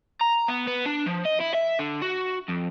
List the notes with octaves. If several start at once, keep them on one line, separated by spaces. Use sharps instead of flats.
A#5
B3
B3
D4
F3
D#5
E4
E5
D3
F#4
F2